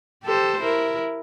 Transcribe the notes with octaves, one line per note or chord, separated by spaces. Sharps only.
G4 A4 C5
E4 A#4